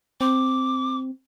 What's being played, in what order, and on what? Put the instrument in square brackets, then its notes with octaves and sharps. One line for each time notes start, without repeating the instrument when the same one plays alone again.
[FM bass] C4 [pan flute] D6